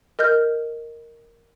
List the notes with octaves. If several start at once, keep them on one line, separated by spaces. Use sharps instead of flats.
A#4 D#5 F6 G6